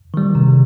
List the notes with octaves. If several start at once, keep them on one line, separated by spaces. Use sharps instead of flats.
D#3 G3
C3